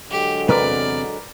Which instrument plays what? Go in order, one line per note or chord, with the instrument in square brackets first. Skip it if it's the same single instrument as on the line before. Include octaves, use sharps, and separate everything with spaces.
[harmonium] D3 F#3 G#3 [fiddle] G4
[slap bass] E2 C3 C4 [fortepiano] A#4 B4 [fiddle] D5